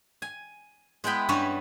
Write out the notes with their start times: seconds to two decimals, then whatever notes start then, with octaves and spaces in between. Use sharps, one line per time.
0.22 G#5
1.04 G#3 B3 E4 G5 B5
1.29 G2 G3 B3 C#4 C#5